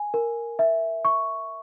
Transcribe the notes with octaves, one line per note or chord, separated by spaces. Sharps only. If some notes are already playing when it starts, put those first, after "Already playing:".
Already playing: G#5
A#4
E5
C#6